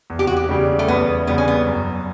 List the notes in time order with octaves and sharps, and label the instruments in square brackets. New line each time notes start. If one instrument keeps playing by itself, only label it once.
[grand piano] E2
[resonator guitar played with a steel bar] G4
F#4
G4
[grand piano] C#3 G3
[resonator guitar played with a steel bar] A3
[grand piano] E2 [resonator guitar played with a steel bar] B3
[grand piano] C#3 G3 [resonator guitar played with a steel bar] B3
[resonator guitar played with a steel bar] C#4
B3
[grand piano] F#2